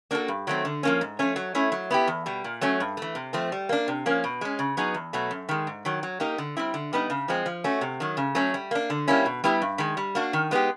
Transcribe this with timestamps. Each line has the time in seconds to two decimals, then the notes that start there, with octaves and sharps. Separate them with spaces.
0.11 A#3 D4 F#4 A4
0.28 G2
0.47 D#3 F#3 A3 C4
0.65 D3
0.83 F3 A#3 C#4
1.01 G#2
1.19 F3 A3 C#4
1.36 F#3
1.55 A3 C#4 E4
1.72 F#3
1.90 B3 E4 G4
2.07 E2
2.26 B2 G3
2.44 A#2
2.61 F#3 A3 C#4
2.80 G2
2.97 E3 A3
3.15 C3
3.33 F3 A3 C4
3.52 G3
3.69 A#3 D4
3.88 C3
4.06 F3 A#3 C#4
4.24 B2
4.41 G#3 C#4
4.59 C#3
4.77 F#3 B3 D#4 G#4
4.94 E2
5.13 B2 F#3 A3
5.31 F#2
5.49 D#3 G#3
5.67 G#2
5.85 D#3 F#3
6.03 F#3
6.20 A#3 D#4 G4 A#4
6.38 D3
6.57 G3 C4 E4
6.74 D3
6.93 G3 B3 D#4
7.10 C#3
7.28 F3 G#3 C4
7.46 F3
7.64 A3 C#4 F#4
7.81 C3
8.00 D#3 F#3
8.17 C#3
8.35 F#3 A3 C#4
8.54 G3
8.71 A#3 D4
8.90 D3
9.08 G3 A#3 C#4 E4
9.26 B2
9.44 G3 B3 E4 G4
9.62 G2
9.78 D#3 G#3
9.97 G3
10.15 A#3 D4 F#4
10.33 D#3
10.51 G#3 B3 D#4 G4